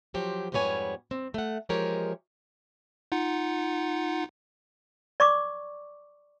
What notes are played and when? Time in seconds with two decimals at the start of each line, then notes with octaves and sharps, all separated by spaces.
0.14 F3 F#3 G4 C5
0.52 F2 G#2 G3 B3 C#5 G#5
1.11 C4
1.34 A3 F#5
1.69 E3 F3 G#3 G4 A#4 C#5
3.12 D#4 F4 F#5
5.20 D5 C#6 D6